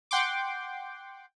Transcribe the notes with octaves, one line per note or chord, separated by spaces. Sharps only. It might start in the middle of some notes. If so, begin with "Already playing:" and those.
F#5 G5 C6 D6